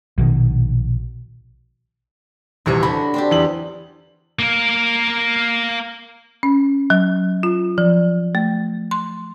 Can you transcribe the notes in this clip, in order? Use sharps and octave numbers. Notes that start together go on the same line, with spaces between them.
A#1 B2 D#3
D#1 E2 C3 F#4 C#5
D3 D4 F#4 B5
C4 D4 G4
E2 F#7
A#3 A#4
C#4
F#3
F4
F3
A3
C6